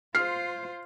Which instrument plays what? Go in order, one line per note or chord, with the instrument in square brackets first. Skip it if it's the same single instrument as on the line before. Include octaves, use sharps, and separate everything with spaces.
[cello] F4 C5 [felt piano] F6 C7